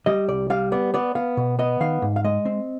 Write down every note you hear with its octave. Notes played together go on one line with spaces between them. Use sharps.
G3 D#5
C2 D5
G3 F5
B3 D5
B3 D5
B3 F5
B2
B3 D#5
D#3 F5
G#2
F5
G#3 D#5
C4